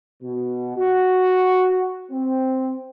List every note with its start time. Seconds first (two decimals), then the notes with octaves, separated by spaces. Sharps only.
0.23 B2
0.77 F#4
2.11 C4